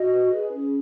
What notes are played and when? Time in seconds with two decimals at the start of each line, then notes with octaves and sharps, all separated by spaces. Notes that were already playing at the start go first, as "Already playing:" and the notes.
Already playing: F#4 D#5
0.10 B4
0.32 G#4
0.53 C#4